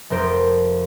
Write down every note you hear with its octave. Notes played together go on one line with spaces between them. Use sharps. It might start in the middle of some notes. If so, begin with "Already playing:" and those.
F1 F2 A#4 C5 D7